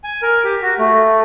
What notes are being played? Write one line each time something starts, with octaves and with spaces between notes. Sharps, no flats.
G#5
A#4
G4
F#4
A3